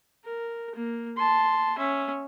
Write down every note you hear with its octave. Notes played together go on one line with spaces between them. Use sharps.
A#4
A#3
A5 C6
C#4 E5